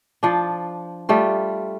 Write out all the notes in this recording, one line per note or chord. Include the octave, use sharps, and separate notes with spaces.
F3 D4
G3 A3 F4